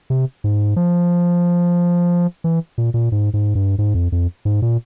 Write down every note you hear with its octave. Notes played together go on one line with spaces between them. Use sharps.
C3
G#2
F3
E3
A#2
A#2
G#2
G#2
G2
G#2
F2
F2
G#2
A#2